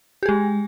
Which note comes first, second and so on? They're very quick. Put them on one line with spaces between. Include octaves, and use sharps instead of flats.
G4 G#4 G#3